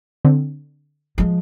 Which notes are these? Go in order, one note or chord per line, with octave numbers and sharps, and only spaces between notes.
D3 C4
F3 G#3